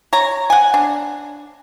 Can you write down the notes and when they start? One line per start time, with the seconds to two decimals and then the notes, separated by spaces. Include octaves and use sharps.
0.13 C#5 A#5
0.50 F#5 G#5
0.74 D4